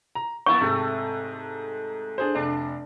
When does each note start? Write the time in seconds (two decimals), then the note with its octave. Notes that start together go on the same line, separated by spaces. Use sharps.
0.15 A#5
0.46 E2 A#3 B3 E4 C#6
0.61 G#2 C3 A3 G4
2.18 D4 G#4 C5
2.35 F1 D4